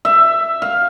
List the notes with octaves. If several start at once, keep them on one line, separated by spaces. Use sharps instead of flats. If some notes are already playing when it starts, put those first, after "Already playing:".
E5
F5